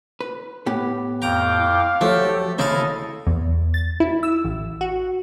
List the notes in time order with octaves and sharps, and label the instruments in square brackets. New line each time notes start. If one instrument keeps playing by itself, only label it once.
[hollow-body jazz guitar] B4
A2 B3 G4
[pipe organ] F2 G5 D6 [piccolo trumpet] F5 [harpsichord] A#5
[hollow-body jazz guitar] F3 F#3 [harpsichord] A3 [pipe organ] G4 A4
[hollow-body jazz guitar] D#2 C#3 C5 [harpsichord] E4 F5 [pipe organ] A4 D#5
[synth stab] E2
A6
E4
E6
A1
F#4